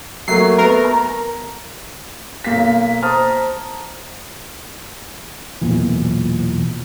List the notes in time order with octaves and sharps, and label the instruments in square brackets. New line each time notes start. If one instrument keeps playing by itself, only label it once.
[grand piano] F#3 A3 A#3 [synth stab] C7
[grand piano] A3 B3 [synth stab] A#4
[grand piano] A#5
[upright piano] B1 A#3 B6
C5 A5 A#5 D#6 F6
[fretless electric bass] B1 E2 A#2 E3